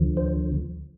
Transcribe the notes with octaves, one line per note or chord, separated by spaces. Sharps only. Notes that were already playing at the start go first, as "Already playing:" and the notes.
Already playing: D2 D3 F3
C5